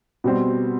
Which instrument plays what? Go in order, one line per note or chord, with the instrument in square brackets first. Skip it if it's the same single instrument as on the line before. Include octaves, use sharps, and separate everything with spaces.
[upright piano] B2 G3 C4